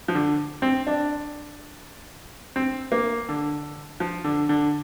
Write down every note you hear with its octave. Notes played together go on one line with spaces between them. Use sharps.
F3
D3
C4
D4
C4
A#3
D3
F3
D3
D3